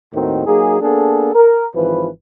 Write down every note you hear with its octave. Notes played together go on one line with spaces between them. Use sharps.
D#2 A2 D#3 C4 D#4 F#4
F#3 A#3 D#4 G#4
A#3 B3 D4 G#4 A4
A#4
G#1 E3 F3 B4